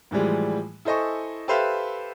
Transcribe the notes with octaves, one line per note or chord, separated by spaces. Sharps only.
A2 E3 F3 G3 G#3
E4 A4 C5 D#5 G#5 C#6
G4 A4 B4 C5 E5 F5